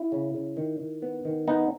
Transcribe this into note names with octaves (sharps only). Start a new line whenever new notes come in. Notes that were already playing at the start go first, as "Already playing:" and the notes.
Already playing: E4
C#3
C#3
D#3
D#3
B3
D#3
B3 D#4